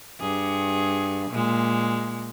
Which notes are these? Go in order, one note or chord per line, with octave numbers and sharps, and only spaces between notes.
G2 G#4
A#2 G#3